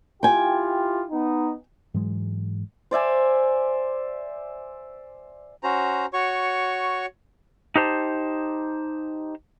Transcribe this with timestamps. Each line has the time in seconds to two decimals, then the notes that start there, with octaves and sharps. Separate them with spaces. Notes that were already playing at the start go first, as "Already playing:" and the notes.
0.23 E4 F4 G4 G5 G#5
1.11 B3 D#4
1.94 G#2 E3 F#3 G#3
2.91 C5 D5 E5 G#5
5.63 C#4 F#4 C5 A#5
6.13 F#4 C#5 C#6
7.76 D#4 G4 C5 A5